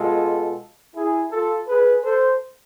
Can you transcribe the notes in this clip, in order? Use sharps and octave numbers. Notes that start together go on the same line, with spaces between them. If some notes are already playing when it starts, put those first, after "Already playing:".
Already playing: B2 G#3 F4 A4
E4 G#4
F4 A4
G#4 B4
A4 C5